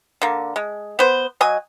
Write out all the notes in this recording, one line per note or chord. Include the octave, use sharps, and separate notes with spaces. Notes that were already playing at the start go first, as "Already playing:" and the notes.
D3 A#3
G#3
B3 C5
F#3 D#5 G#5